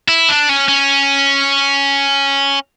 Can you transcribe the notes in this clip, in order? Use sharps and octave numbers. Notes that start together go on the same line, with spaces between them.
E4
D4
C#4
C#4